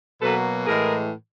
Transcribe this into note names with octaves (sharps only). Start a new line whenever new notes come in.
B2 F#3 A#3 A4 B4
A2 E3 G#3 G#4 A#4